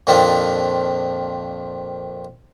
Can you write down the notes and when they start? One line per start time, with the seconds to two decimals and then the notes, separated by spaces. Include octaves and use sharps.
0.07 F2 A#2 D#3 F3 C4 D4